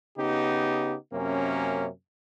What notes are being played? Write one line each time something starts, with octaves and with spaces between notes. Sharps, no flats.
C#3 B3 D#4 G4
F#2 C3 A#3 C#4